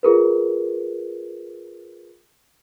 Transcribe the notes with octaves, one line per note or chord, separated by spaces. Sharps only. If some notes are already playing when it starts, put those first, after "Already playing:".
F4 G#4 A#4 B4